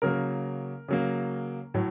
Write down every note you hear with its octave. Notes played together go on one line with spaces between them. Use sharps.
C#3 F#3 A#3 A#4
C#3 F#3 A#3
A2 F#3